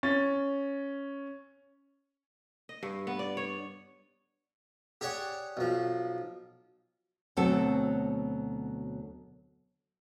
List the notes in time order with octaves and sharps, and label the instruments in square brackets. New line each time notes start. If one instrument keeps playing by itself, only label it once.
[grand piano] C#4 A6
[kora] D#5
G2
B3
D5
C#5
[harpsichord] G4 G#4 C#5 D5 F#5
B1 F3
[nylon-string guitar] D2 B2 F#3 C4 A4